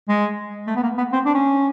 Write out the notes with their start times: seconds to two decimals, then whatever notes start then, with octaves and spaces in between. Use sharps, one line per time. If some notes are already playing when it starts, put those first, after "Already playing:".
0.09 G#3
0.67 A3
0.76 B3
0.83 A#3
0.98 B3
1.12 C4
1.25 D4
1.34 C#4